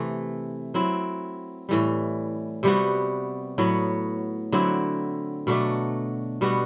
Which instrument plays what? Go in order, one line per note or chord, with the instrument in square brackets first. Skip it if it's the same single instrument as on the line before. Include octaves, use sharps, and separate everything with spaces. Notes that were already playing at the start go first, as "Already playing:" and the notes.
Already playing: [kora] C3 E3 A3
F#3 C4 E4
A2 E3 G3
C3 G3 B3 F#4
A2 F#3 B3
D3 F#3 C4 E4
B2 F#3 A3 D4
B2 G3 B3 F#4